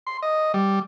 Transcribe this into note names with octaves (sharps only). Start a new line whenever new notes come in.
C6
D#5
G3